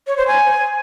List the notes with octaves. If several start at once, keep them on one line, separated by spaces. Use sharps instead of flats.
C#5
C5
G#5